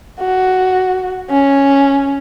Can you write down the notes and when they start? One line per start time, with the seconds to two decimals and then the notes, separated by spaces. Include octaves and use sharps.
0.20 F#4
1.30 C#4